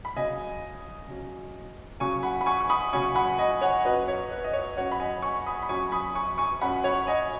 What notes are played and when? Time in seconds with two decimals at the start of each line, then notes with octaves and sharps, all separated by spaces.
0.05 B5
0.16 C#3 F#3 C#4 D#5 G#5
1.08 C#3 F#3 C#4
2.00 C#3 F#3 C#4 G#5 C#6
2.23 F#5 B5
2.41 B5
2.46 G#5 C#6
2.60 C#6
2.70 B5 D#6
2.93 C#3 F#3 C#4 G#5 C#6
3.15 F#5 B5
3.38 D#5 G#5
3.61 C#5 F#5
3.85 F#2 F#3 C#4 B4 D#5
4.08 C#5
4.31 B4
4.44 D#5
4.53 C#5
4.77 F#2 F#3 C#4 C#5 F#5
4.92 B5
5.00 D#5 G#5
5.22 G#5 C#6
5.46 B5 D#6
5.62 B5
5.69 F#2 F#3 C#4 G#5 C#6
5.92 B5 D#6
6.15 G#5 C#6
6.38 G#5 C#6
6.61 F#2 F#3 C#4 F#5 B5
6.84 C#5 F#5
7.07 D#5 G#5